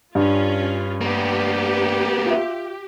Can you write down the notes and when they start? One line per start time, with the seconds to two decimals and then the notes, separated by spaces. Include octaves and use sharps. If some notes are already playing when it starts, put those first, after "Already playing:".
0.15 G2 C#4 F4
1.01 A#3 B3 G4
2.26 F4 E5